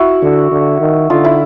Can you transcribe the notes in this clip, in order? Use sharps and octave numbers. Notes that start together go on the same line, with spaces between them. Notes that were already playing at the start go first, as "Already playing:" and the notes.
Already playing: E4 F#4
D3
D3
D#3
D3 D#4 F4
E4